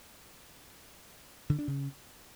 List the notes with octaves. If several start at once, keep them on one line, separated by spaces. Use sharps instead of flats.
D3
D4
C#3